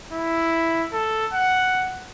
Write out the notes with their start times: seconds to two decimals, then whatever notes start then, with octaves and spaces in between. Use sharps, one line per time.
0.13 E4
0.93 A4
1.34 F#5